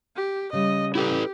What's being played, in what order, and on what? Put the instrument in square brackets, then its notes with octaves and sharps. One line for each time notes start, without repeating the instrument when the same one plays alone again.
[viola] G4
[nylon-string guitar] C#3 G3 [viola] D#5
[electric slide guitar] E4 A4 B4 [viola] G4